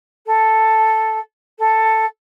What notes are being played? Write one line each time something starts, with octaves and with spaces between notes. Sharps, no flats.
A4
A4